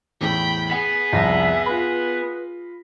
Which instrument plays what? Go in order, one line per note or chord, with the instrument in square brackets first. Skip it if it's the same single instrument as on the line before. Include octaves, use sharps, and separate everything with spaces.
[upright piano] E2 A2 [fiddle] G5 B5
[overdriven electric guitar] B3 [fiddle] G#4 [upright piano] F#5
[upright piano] C2 F2 A#6 [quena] E5
[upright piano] F4 B5 [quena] B4